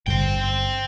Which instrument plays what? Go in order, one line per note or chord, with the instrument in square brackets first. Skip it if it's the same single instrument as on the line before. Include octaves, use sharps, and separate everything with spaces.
[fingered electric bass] G#1 G2 D3 [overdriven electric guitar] C5 G5